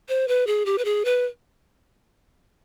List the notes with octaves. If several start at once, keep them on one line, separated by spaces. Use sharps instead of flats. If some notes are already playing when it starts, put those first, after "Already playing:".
C5
B4
G#4
G4
B4
G#4
B4